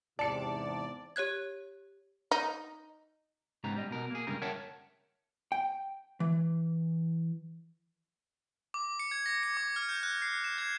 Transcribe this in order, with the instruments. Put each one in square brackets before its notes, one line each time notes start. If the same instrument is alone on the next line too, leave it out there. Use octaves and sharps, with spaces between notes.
[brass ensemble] E2 G#2 C3 [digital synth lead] D5 [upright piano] A5 C#7
[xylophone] G4 C#5 F#6 G#6
[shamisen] D#4
[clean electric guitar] G#2 C#3 B3 G4 A#5
G3 D#5
B2 A#4
A#3 G#4
G2 C#3 G3 G#3 A#4
A#4 C#5 E5 F#5 G5 A5
[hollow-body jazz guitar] G5
E3
[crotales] D6
C#7
G#6
A#6
C#7
D6
F6
G6
F#6
C7
E7
G#6